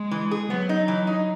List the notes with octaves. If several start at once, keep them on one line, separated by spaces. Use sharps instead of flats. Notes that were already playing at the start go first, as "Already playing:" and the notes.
Already playing: G#3
E3
G#4
F#3 B3
D#4
E3
D#4